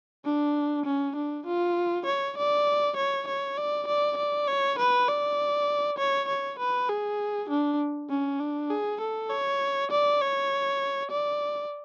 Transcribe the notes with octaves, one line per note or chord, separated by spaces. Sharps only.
D4
C#4
D4
F4
C#5
D5
C#5
C#5
D5
D5
D5
C#5
B4
D5
C#5
C#5
B4
G#4
D4
C#4
D4
G#4
A4
C#5
D5
C#5
D5